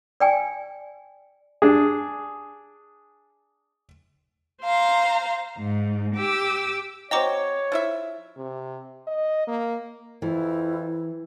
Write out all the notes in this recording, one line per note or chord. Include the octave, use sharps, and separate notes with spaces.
D5 G5 G#5
D4 G#4
C5 F5 A#5
G#2
G4 D6 E6
C4 F#4 C#5 D#5 G5 A#5 D6
F3 E4 E5
C3
D#5
A#3
F2 E3 E4